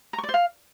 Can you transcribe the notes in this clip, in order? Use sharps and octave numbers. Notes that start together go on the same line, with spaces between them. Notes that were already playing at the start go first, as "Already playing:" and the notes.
A#5
C#6
D5
C5
F5